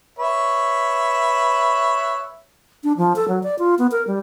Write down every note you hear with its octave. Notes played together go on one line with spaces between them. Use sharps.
B4 C#5 E5
D4
F3
A4
F#3
D5
F4
B3
A#4
G3